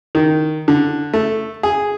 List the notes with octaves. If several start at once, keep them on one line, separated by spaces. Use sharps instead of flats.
D#3
D3
A3
G#4